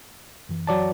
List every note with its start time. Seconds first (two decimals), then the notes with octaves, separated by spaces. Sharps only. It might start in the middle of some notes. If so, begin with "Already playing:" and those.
0.49 F#2 E3
0.67 F#3 D5 A5